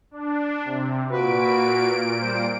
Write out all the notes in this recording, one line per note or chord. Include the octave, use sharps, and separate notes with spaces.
D4
C3
A#2 F#4 B4 D7
G3 C5